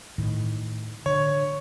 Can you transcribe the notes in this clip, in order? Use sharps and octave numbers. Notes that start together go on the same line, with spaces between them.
A2 D#3
D3 C#5